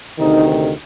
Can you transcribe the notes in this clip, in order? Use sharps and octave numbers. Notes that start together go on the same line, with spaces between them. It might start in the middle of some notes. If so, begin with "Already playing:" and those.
D2 C3 D#3 D#4